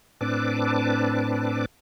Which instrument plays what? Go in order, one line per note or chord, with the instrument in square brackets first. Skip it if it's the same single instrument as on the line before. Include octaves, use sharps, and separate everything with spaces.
[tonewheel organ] A2 C4 D4 B4 A5 D6